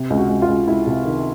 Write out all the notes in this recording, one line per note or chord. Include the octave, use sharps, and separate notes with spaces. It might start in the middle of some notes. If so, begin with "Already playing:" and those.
Already playing: C3
C#2
F#4
C#2
F4
C#2
C#2 E4
C3
D#3